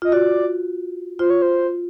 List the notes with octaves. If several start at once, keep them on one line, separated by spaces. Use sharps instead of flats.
F4 D#5
F#4 D5
F4 C5
C#5
C5